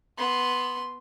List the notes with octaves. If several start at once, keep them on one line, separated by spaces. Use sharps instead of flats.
B3 C6